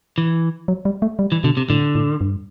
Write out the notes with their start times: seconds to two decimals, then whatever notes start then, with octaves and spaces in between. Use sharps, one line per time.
0.18 E3
0.68 F#3
0.85 G3
1.02 A3
1.19 G3
1.32 E3
1.44 B2 D3
1.57 C3
1.70 A2 D3
1.95 A2
2.21 G2